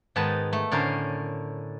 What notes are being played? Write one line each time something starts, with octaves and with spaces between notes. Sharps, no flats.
G#2 D#3 B3 B4 D#5 A5
A3
A2 D3 C#4 A#4 C5